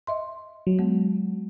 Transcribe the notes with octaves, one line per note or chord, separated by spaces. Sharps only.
D#5 E5 C6
F#3
G#3 B3